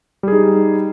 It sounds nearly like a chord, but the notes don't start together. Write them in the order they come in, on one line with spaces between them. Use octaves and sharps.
G3 G#4 D#4